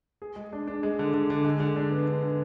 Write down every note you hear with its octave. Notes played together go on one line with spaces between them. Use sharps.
G#4
G#3
D4
D4
G#3
D3
D3
D3
G#3
D3
D4
B3
D3
D3